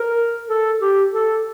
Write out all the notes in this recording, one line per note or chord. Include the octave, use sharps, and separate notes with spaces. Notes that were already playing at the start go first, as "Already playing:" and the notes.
Already playing: A#4
A4
G4
A4